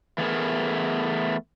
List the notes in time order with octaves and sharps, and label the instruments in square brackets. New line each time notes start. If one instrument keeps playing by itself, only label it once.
[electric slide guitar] E3 A3 B3 G#4 A#4